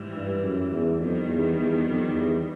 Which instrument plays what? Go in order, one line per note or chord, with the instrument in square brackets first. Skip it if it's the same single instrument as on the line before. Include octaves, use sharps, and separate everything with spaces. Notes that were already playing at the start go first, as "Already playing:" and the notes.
Already playing: [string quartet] G#2 E3 G3
[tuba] G2
F#2
E2
[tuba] F2 [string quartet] D#3 G3 B3
[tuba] E2
E2
F2
E2